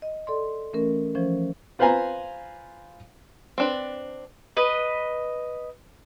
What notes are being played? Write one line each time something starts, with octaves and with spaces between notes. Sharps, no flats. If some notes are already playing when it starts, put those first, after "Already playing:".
D#5
A4 D5 C6
E3 A3 C#4 A#4
E3 F3 C#4 C5
F4 B4 C5 F5 G#5 A#5
C4 D4 B4
B4 D#5